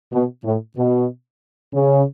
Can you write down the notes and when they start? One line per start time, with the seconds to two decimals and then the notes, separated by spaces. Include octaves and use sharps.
0.12 B2
0.44 A2
0.77 B2
1.73 C#3